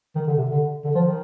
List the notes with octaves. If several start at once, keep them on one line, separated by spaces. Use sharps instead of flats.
D#3
D3
C3
D3
D3
F3
D#3